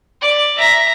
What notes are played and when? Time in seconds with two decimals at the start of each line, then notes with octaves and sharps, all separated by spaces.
0.21 D5
0.58 E5 A#5